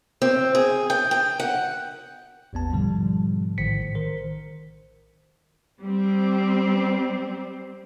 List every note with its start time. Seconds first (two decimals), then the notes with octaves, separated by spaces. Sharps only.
0.22 C4
0.55 G#4
0.90 G5
1.11 G5
1.40 F#5
2.53 A1 E2 B3 A5
2.72 G#2 B2 D3 F3 G3
3.58 A#1 A2 D#3 C5 B6 C#7
3.95 D#3 A#4 C5
5.81 G3 C4